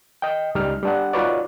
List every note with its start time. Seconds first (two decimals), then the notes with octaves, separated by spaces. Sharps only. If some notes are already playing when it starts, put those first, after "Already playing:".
0.22 D#5 G5
0.55 C#2 G3 D#4 F6
0.83 G3 D4 F#5
1.13 D#4 F4 F#4 B4 C#5 D5